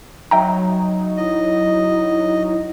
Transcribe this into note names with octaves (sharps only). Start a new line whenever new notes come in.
F#3 D#4 E5 G5 A#5
E4 D#5